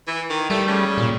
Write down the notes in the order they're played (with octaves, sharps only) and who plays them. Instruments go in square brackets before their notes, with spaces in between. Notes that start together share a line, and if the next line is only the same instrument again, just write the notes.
[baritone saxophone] E3
D#3
[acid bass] G3 [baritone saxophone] A3
[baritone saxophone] C#3
[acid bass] A#2